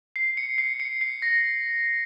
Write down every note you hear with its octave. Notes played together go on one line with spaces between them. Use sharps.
C7
C#7
C7
C#7
C7
A#6